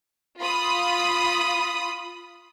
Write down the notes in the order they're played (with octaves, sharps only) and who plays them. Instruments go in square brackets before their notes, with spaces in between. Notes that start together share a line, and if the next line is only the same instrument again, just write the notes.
[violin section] F4 B5 D#6